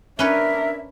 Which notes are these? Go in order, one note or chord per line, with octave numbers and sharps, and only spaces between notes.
C#4 D4 A#4 B4 C#5 E5